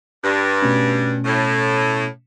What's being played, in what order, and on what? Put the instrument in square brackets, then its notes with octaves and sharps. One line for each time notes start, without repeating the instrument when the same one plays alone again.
[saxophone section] G2
[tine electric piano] B2 A3 C#4
[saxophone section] A2